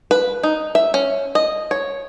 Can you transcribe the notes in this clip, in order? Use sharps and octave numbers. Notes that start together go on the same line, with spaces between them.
B4
D#4
E5
C#4
D#5
C#5